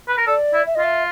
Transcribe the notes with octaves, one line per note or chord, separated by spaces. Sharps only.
B4
A#4
A4 D5
E4
E5
D#5
F4 E5